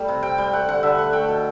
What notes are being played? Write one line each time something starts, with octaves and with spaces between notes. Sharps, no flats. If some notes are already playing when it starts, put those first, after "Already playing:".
Already playing: G3 A3
C3
C3 G5
G3 G5
A3 F#5
D3 F#5
D3 E5
A3 F#5
A3 G5
B2